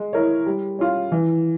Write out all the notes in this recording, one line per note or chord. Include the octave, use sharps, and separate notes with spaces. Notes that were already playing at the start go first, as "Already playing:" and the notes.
Already playing: G#3
E4 A#4 C#5
G3
C#4 F4
E3